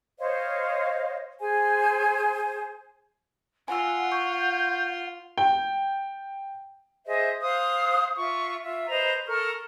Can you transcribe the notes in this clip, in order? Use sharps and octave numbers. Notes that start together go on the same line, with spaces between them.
C5 C#5 D#5 F5
G#4 C5 G#5
F4 F#5 G#5 E6
C#6 G6
G5
G#4 C5 D#5 E5
C5 F5 D#6 F#6
F4 E5 C#6
F4 E5
B4 C5 D#5 A#5
A4 A#4 C#6 F6